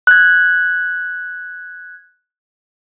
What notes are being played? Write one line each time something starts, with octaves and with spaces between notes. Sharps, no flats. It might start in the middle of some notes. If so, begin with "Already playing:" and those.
F#6 G#6